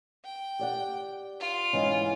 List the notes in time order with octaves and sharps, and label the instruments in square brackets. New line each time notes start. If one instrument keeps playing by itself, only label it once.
[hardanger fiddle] G5
[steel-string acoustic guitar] G4 D5 F#5
[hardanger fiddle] F4
[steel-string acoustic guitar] G#2 E3 C#4